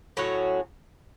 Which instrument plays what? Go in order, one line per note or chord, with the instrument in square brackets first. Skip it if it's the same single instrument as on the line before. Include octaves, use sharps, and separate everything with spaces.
[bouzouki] A2 F#3 C#4 F#4